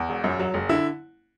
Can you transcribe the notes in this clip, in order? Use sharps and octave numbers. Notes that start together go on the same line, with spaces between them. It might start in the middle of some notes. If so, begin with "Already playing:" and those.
Already playing: E2
E1
F#2
F#3
F#1
D3 E4